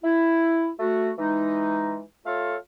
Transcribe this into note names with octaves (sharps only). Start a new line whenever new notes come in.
E4
A3 F#4
E3 G#3 D#4
A3 F4 A4 C#5 F5